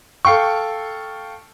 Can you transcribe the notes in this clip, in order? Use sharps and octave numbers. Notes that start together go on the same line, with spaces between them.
A4 F5 G5 C#6